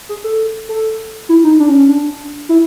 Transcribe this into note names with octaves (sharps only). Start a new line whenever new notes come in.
G#4
A4
A4
E4
D#4
D4
C#4
C#4
D4
E4